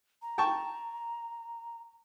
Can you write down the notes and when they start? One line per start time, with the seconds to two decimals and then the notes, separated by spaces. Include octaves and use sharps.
0.22 A#5
0.38 G5 A5 C#6